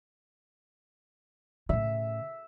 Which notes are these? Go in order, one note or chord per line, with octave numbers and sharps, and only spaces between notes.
A2 C#3 E5